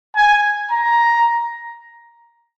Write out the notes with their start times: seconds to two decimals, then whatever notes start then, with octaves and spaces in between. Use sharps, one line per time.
0.16 G#5
0.71 A#5